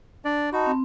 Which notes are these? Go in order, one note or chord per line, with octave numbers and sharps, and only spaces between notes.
D4 D5
D#4 F#4 A5 B5
C4